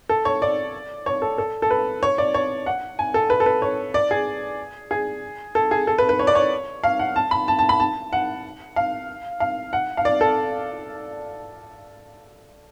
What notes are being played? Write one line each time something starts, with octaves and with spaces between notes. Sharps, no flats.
A4
C#5
D5
C#5
A4
A4
A4
B4
C#5
D5
C#5
F#5
G#5
A4
B4
A4
B4
C#5
D5
G#4
G#4
A4
G#4
A4
B4
B4
C#5
D5
C#5
F5
F#5
A5
B5
A5
A5
B5
A5
F#5
F5
F5
F#5
F5
D5
A4